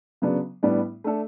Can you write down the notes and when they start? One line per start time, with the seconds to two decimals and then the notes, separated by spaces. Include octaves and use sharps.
0.22 C#3 F#3 B3 D4
0.63 A2 G3 B3 D4
1.04 A3 D4 A4